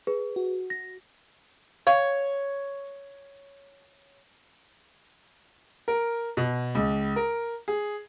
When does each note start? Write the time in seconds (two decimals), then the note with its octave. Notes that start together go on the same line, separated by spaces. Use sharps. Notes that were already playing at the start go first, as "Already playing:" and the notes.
0.07 G#4 B4
0.36 F#4
0.70 A#6
1.87 C#5 F5
5.88 A#4
6.37 B2
6.75 C#2
7.16 A#4
7.68 G#4